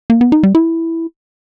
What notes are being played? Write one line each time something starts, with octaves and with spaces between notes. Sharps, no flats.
A#3
B3
D#4
G3
E4